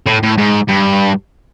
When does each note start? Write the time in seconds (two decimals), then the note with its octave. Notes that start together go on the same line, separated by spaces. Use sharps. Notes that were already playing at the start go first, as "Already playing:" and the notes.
0.06 A2
0.23 A2
0.38 G#2
0.68 G2